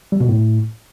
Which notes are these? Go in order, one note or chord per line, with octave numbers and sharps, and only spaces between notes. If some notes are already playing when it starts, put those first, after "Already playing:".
G3
B2
A2